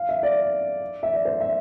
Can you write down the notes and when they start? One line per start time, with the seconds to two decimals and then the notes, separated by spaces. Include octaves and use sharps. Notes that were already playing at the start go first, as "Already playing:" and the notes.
Already playing: F5
0.09 E5
0.23 D5
1.03 E5
1.14 D5
1.25 C5
1.40 E5